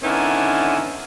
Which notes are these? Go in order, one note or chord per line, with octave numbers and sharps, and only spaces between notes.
D3 D#3 A#3 B3 C#4 E4